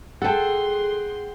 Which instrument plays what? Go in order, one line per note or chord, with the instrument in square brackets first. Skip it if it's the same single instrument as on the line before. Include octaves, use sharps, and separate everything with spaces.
[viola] G#4 C6 [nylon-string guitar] A4 A5 [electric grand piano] F#5 G5